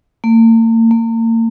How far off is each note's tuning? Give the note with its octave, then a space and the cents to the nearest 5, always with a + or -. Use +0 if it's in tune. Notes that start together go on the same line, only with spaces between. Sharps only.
A#3 -45
A#3 -40